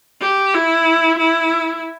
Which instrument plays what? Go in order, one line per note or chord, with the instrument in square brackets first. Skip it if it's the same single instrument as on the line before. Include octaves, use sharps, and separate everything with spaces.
[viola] G4
E4
E4